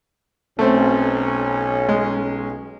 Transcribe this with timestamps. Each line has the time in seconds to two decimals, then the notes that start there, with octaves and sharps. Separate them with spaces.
0.59 B1 A3 C4 C#4
1.89 G#3